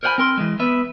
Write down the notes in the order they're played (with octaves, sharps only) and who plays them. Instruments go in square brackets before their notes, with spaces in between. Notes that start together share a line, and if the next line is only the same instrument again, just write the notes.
[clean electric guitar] A#4 C5 C#5 F#5 G#5 B5
C4 A#4 C6
E3 G#3
B3 B4 E5